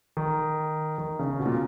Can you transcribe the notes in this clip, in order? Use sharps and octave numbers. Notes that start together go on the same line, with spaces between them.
D#3
D#3
C#3
B2
A#2